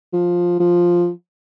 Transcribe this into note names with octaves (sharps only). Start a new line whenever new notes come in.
F3
F3